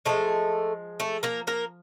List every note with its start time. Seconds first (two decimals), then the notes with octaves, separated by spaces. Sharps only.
0.05 D3 F3 G#3 A3 A4
1.00 A3 A4
1.23 A#3 A#4
1.47 A#3 A#4